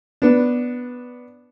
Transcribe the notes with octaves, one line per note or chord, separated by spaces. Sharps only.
B3 D4